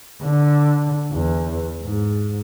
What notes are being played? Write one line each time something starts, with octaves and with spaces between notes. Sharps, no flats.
D3
E2
G#2